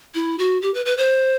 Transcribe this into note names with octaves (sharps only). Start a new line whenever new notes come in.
E4
F#4
G4
B4
B4
C5